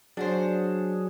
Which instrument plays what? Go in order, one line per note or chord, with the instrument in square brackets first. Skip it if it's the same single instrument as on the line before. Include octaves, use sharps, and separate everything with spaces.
[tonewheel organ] F#3 G#4 [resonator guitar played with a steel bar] D4 F#4 C5